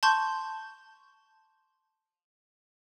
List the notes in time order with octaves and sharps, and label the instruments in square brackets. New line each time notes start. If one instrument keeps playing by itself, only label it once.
[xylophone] A5 C6 C#6 G6 E7